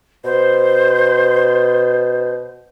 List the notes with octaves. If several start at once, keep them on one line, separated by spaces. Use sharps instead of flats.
B2 C5